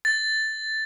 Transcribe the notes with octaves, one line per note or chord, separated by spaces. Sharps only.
A6